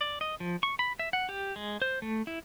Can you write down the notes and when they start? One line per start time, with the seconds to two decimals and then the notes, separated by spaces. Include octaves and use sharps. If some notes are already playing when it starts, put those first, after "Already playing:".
0.01 D5
0.21 D#5
0.40 F3
0.63 C#6
0.79 B5
0.99 E5
1.13 F#5
1.29 G4
1.56 G#3
1.82 C5
2.02 A3
2.27 E4